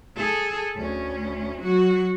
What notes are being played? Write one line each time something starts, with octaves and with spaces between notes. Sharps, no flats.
G#4 A4
D2 C#4
F#3 F#4